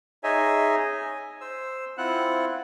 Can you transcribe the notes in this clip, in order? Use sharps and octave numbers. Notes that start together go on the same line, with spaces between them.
D#4 G#4 C#5 D#5 E5 G#5
G#5
C5 E6
C4 E4 F4 F#5 F#6